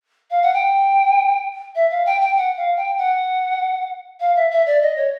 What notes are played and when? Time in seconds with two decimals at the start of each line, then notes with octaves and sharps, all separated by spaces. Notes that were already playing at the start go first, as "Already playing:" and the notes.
0.30 F5
0.42 F#5
0.53 G5
1.75 E5
1.90 F5
2.06 G5
2.21 G5
2.37 F#5
2.57 F5
2.76 G5
2.98 F#5
4.20 F5
4.36 E5
4.51 E5
4.66 D5
4.81 D#5
4.96 C#5